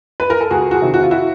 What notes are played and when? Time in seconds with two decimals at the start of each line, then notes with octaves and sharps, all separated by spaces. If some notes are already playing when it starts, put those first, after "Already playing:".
0.20 B4
0.30 A#4
0.41 A4
0.50 C#2 F#4 G#4
0.71 F#4 G#4
0.82 C3 D#3
0.94 F#4
1.03 F4
1.11 E4 F#4